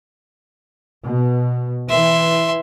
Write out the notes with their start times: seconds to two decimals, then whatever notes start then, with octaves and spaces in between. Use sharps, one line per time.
1.02 B2
1.90 E3 E5 C6